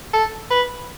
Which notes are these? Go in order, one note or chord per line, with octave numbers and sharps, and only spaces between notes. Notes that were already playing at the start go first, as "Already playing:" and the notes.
A4
B4